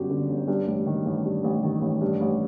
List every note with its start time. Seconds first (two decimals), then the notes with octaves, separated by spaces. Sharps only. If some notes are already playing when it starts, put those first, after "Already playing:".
Already playing: G1 F#2 D3 F#3 F#4 G4
0.10 D3
0.29 G1
0.48 G2
0.67 A1
0.86 D#3
1.06 A1
1.25 G2
1.44 A1
1.63 D#3
1.82 A1
2.01 G2
2.21 A1